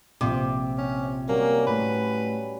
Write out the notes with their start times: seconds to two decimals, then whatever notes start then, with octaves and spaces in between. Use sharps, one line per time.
0.21 A#1 C3 F4 D6
0.78 C#4
1.29 F#3 G3 A#3 C#4
1.67 A2 B4